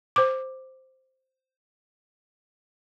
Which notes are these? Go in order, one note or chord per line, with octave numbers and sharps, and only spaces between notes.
C5 D6